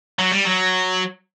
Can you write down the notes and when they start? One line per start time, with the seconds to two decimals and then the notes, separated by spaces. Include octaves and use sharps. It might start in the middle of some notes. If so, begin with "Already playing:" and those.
0.19 F#3
0.31 G3
0.45 F#3